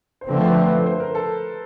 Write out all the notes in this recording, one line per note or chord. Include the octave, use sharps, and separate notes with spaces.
C5
D3 F3 A3 C4 B4
C5
B4
B4
C5
A#4
A4